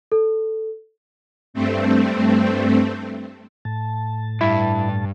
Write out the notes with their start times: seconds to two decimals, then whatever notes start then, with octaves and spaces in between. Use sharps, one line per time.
0.12 A4
1.54 G2 A3 C4
3.65 A2 A5
4.41 G2 E4